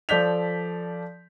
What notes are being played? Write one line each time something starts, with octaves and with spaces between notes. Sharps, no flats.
F3 A4 D5 G6 B6 F7